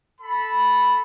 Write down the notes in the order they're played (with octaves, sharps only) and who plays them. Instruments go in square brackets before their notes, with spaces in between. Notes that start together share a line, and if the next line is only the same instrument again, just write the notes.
[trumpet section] A4 B5